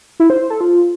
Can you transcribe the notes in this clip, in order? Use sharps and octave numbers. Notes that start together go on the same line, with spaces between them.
E4
C5
C5
A4
F4